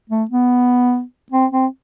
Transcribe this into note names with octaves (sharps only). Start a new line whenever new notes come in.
A3
B3
C4
C4